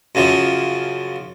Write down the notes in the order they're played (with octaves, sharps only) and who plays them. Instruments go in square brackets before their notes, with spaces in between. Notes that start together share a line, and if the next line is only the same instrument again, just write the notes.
[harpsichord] F#2 C#3 F3